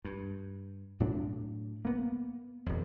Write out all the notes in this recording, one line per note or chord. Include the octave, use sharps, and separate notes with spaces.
G2
A2 F#3 D4
A#3 B3
D#1 F2